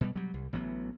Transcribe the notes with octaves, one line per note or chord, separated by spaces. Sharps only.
B2 G3
F#3 G3
C2
A1 E3 F#3 B3